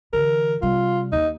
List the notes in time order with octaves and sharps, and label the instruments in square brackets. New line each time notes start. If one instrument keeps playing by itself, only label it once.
[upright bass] D3 E3 [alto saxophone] A#4
[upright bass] C3 G3 [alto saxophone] F4
[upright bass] D#2 [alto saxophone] D#4